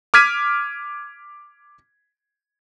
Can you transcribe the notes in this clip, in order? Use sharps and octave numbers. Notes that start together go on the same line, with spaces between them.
D6 F6 G#6 B6 D#7